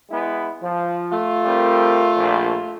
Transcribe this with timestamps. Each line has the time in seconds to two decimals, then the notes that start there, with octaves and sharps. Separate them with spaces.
0.11 G#3 B3 E4
0.63 F3
1.12 A3 F4
1.45 G3 C4 A#4
2.16 A#1